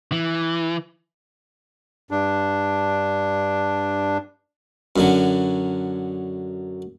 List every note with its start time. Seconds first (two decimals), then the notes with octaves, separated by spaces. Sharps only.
0.12 E3
2.11 G2 D4
4.96 F#2 D3 F#3